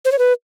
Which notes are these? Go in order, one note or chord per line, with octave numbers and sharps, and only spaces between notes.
C5
C#5
B4